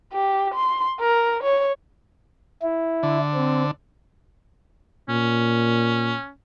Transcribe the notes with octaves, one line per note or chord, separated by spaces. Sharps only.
G4
C6
A#4
C#5
E4
D3
C4
A#2 C#4